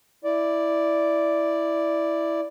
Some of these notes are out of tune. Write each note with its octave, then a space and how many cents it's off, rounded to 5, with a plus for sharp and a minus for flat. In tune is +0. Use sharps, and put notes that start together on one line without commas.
E4 +0 D5 +0